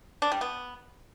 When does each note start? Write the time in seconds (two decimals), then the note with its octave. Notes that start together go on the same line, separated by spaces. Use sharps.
0.22 D4
0.32 G3
0.41 B3